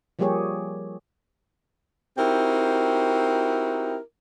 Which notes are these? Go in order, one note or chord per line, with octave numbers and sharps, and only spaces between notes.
F3 G3 A#3 G4 G#4 C#5
C4 D#4 E4 F#4 G4 A#4